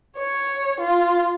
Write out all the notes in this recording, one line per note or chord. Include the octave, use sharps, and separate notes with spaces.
C#5
F4